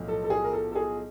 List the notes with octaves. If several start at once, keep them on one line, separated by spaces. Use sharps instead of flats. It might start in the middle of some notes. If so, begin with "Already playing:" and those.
Already playing: B1 A2 F3
A4
A4
G#4
A#4
A4
A4
G#4